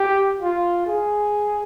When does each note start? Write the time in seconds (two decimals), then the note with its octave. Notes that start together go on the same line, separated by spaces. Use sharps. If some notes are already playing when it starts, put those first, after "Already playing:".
Already playing: G4
0.40 F4
0.86 G#4